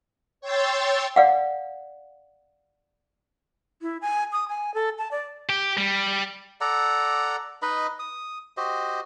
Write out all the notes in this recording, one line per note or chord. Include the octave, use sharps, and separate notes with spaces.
C#5 G5 C6 E6 A6
D5 F5 F#5
E4
G#5
D#6
G#5
A4
A5
D5
G4
G3
A4 D5 F#5 A#5
D#4 B4 D#5 B5
D#6
F#4 G4 C5 D#5